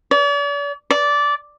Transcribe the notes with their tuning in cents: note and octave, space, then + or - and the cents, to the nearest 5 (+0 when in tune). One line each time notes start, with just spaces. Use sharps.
D5 -45
D5 -15